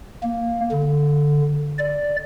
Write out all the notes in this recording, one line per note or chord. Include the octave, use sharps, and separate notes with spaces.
A#3
D3
D5